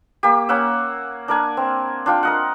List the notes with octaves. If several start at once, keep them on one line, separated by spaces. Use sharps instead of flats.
A#3 G4
A#3 C#4 F#5 E6
D4 A#4 G#5
C4
D4 F4 G5
A#4 D#5 F#5